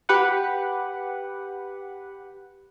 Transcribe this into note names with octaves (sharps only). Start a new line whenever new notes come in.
G4 B4 F#5